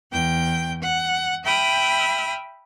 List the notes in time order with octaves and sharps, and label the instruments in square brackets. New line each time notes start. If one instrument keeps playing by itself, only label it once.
[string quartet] E2 G5 G6
F#5
E5 G5 B5 D#6 F6